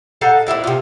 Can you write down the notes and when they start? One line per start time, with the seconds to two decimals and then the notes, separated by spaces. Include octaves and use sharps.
0.21 D#4 A4 F5 F#5
0.47 A#2 G#3 E4 D5
0.64 C3 F4